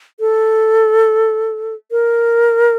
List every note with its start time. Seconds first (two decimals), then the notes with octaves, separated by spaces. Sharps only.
0.20 A4
1.91 A#4